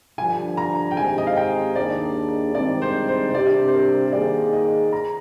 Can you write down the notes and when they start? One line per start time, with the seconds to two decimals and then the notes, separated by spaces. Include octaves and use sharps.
0.18 G2 D3 F3 G#5
0.57 A#5
0.91 G5
0.97 D#3 G#3 C4 G4 C5 G#5
1.18 D#5
1.27 F5
1.36 G5
1.76 D#2 D#3 A#3 D4 G#4 D5
2.54 G2 D#3 G#3 C4 D5
2.82 C5
3.08 C5
3.30 C5
3.34 C3 G3 D4 G4 D5
3.67 C5
3.74 A#4
4.13 D#3 A#3 D#4 G#4 D5
4.53 D#5
4.93 A#5